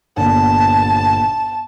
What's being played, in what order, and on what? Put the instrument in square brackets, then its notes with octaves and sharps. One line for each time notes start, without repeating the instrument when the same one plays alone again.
[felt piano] G1 A#2 [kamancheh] A5